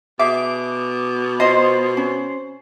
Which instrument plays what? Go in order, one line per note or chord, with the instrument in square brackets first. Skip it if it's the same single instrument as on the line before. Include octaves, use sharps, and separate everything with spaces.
[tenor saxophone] B2 [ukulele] G#4 E5 [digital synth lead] D6
[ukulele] F4 D#5 [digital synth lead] C5
[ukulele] C#4